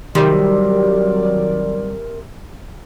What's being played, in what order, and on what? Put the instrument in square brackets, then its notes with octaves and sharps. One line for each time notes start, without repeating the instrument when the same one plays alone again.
[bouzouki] C3 [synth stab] D#3 G3 [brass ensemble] F#3 D5 [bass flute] A#4